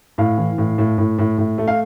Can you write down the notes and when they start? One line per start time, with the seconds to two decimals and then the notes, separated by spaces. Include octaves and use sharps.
0.18 A2 F5
0.38 E3
0.58 A2
0.78 A2
0.98 A2
1.19 A2
1.38 A2
1.58 A3
1.68 F5